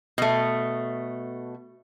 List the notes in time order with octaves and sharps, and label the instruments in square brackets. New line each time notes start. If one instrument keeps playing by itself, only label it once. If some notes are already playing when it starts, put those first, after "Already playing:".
[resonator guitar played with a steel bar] B2 A3